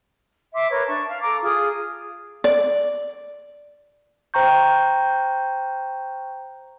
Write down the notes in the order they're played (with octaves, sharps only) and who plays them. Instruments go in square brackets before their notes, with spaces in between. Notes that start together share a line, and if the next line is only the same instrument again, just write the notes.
[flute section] E5 C6 D6
A#4 B4 C#5
D4 A5 C#6
F5
A4 A#5 D6
F4 G#4 D#6
[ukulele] D5
[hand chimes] C5 G5 A#5 C#6 G6